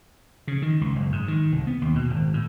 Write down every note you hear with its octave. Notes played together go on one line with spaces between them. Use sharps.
C#3
D#3
C#2
F#1
G#2
D#3
C2
B3
D#2
B2
G#1
A2